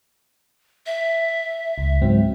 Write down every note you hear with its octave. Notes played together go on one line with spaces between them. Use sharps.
E5
C#2
G#2 F#3 C4